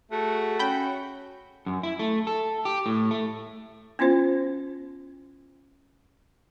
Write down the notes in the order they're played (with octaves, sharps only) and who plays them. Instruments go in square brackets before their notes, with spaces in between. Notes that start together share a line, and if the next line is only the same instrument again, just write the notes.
[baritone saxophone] A3 [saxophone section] F#4 [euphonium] G#4
[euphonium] C#4 [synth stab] G5 B5
[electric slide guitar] F#2
E4
A3
A4
G4
A2
A3
[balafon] B3 C#4 E4 F4 C5